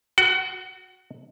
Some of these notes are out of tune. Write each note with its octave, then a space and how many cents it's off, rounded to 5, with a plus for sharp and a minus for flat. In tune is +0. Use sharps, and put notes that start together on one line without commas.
F#4 -15 F#5 +30